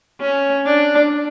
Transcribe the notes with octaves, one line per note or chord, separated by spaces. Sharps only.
C#4
D4